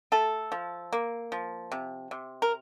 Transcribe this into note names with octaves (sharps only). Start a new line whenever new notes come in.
A3 A4
F3
A#3
F3
C3
C3
A#4